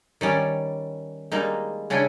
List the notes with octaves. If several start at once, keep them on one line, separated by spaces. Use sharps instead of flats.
D#3 G3 C#4 D5
G3 G#3 A#3 D#4
C#3 C#4 D4 E4 G5 G#5